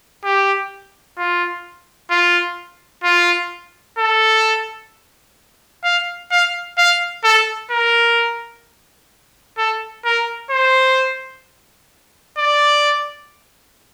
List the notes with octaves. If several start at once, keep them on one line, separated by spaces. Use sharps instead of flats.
G4
F4
F4
F4
A4
F5
F5
F5
A4
A#4
A4
A#4
C5
D5